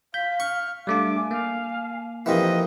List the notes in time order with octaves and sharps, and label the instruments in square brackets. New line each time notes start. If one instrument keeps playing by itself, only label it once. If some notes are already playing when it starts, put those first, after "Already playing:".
[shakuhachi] F5 [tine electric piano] G6 [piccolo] B6
[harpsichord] C#6 [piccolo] F6
[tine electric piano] G3 A3 D4 [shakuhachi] F5 [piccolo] D6
[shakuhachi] G#5
[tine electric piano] A#3 [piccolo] F5
[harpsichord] F2 C3 E3 [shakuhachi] A#4 [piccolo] D#5